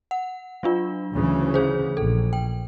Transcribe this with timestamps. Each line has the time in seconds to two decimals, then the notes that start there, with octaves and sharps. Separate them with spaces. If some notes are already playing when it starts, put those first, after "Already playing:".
0.11 F#5
0.63 F#3 D4 F4
1.12 D2 C#3 E3
1.54 G#4 C5
1.97 A#1 A4
2.33 G5